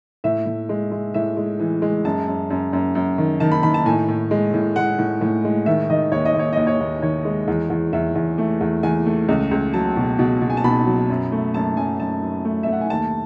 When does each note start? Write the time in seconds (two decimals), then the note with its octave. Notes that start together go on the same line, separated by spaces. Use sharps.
0.24 A2 E5
0.46 A2
0.69 G#3
0.92 G#3
1.14 A2 E5
1.37 G#3
1.59 E3
1.82 G#3
2.05 F#2 A5
2.28 F#2
2.50 F#2
2.73 F#2
2.95 F#2
3.18 D#3
3.40 D#3 A5
3.52 B5
3.63 D#3 B5
3.74 A5
3.86 A2 G#5
4.09 A2
4.31 G#3
4.54 A2
4.76 G#3 F#5
4.99 A2
5.21 A2
5.44 G#3
5.66 D#3 E5
5.90 D#3 D#5
6.12 D#2 C#5
6.25 D#5
6.35 D#2 C#5
6.53 D#2 D#5
6.67 C#5
6.80 D#2
7.02 D#3 C#5
7.25 G#3
7.48 E2
7.70 E2
7.93 E2 E5
8.15 E2
8.38 A3
8.61 E2
8.83 E2 G#5
9.06 A3
9.28 C#2
9.51 C#2
9.74 F#3 A5
9.97 B2
10.19 B2
10.41 B2
10.50 G#5
10.57 A5
10.64 B2 B5
10.86 F#3
11.10 F#2
11.32 A3
11.54 F#2 A5
11.77 F#2 G#5
12.00 F#2 A5
12.23 F#2
12.45 A3
12.63 E5
12.68 A3 F#5
12.81 G#5
12.90 D#2 A5